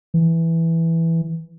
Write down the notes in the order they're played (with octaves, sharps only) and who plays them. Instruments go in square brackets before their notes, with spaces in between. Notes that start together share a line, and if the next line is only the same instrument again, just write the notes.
[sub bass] E3